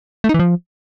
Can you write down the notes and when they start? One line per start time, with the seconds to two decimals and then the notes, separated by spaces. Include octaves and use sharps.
0.24 A3
0.29 D#4
0.34 E3
0.39 F3